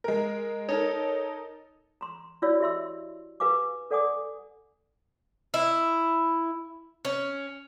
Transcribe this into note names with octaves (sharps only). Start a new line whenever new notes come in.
G#3 A#4
D#4 A4 A#4 C#5
A#5 C6
E4 F#4 C#5 D5 F5 E6
G4 D#5 E5 C6 E6
G4 B4 F5 G#5 D6
A4 D5 F#5 G#5 D6 D#6
E4
C#4